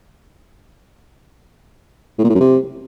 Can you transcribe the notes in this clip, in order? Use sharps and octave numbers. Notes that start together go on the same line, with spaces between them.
A2
A#2
A2
F#2
C3